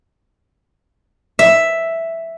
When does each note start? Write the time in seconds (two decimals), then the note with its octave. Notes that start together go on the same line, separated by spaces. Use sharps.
1.39 E5